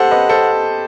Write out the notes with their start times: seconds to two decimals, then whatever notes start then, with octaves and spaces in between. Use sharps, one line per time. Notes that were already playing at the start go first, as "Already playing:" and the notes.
Already playing: G4 A4 C5 F#5
0.11 B4 D#5
0.29 A4 C5